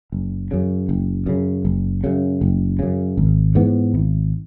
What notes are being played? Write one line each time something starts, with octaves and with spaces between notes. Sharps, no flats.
F#1
F#2 C#3
F#1
F#2 C#3
F#1
F#2 C#3
F#1
F#2 C#3
G#1
G#2 E3 B3
G#1